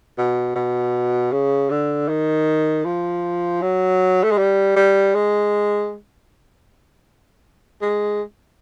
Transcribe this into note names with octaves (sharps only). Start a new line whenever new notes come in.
B2
B2
C#3
D3
D#3
F3
F#3
A3
G#3
G3
G3
G#3
G#3